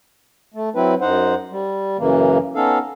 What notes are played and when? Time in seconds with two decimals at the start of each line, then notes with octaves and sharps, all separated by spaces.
0.54 A3
0.75 F#3 C4 E4 B4
1.01 F#2 D#4 C5 F#5
1.52 G3
1.99 F#2 C#3 E3 A#3
2.56 B3 C#4 D#4 A4 F5